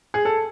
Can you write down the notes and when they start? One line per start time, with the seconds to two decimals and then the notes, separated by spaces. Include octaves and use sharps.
0.14 G#4
0.25 A4